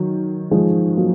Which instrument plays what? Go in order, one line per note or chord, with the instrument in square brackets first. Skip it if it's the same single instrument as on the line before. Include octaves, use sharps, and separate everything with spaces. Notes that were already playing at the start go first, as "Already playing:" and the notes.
Already playing: [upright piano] D#3 F#3
F3 G#3
F#3 A#3